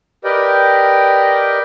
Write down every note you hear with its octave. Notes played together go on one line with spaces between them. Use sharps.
G4 A#4 B4 D5 D#5 G5